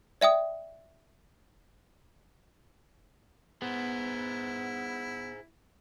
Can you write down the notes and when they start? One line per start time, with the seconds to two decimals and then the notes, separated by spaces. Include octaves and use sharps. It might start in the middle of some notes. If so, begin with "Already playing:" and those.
0.21 D5 E5 G5 D#6
3.62 B3 E4 G#4 C5